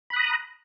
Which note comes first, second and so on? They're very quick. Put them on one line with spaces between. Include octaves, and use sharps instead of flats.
B5 F#6 D#6 A#5